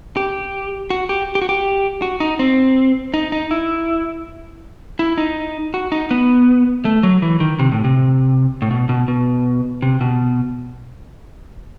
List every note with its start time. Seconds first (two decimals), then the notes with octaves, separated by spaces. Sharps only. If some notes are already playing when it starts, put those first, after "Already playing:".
0.17 G4
0.90 F#4
1.09 G4
1.35 G4
1.42 F#4
1.49 G4
2.02 F#4
2.20 D#4
2.39 C4
3.14 D#4
3.32 D#4
3.51 E4
4.99 E4
5.18 D#4
5.74 F#4
5.92 D#4
6.11 B3
6.85 A3
7.03 F#3
7.22 E3
7.40 D#3
7.59 C3
7.72 A2
7.84 C3
8.62 A2
8.71 B2
8.89 B2
9.08 B2
9.82 C3
10.01 B2